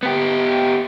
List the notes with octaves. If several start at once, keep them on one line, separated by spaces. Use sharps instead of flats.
B3 G4